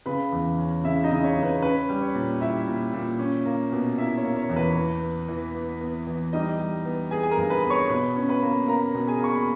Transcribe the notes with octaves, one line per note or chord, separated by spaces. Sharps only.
C#3 B4 B5
E2
C#4
C#3 E4 E5
D#4 D#5
C#3
C#5
C#3
B4
C#4 B4
G3
C#5
A#2
G3 E4 E5
A#2
A#2
C#4
A#3
B2
A#3 E4 E5
C#5
A#3
C#5
E2
B4
E3
B3
E3
B3
B3
E3
G3 D#4 D#5
G3
B3
B3 G#4 G#5
G#5
A#4 A#5
G2
B4 B5
B3 B5
C#5 C#6
B2 B4 B5
C#4
B4 B5
A#3
A#3 A#4 A#5
B2
G#4 G#5
A#3 C#6
B5